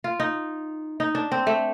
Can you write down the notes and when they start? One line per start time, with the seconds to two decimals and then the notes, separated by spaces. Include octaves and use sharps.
0.04 F4
0.20 D#4
1.00 D#4
1.15 D4
1.32 C4
1.47 A3